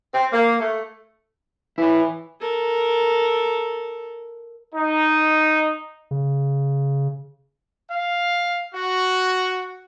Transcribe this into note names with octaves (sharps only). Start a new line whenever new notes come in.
C4
A#3
A3
E3 E4 C#5
A4 A#4
D#4
C#3
F5
F#4